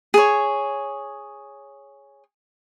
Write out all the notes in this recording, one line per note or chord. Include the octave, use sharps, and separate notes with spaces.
G#4 C#5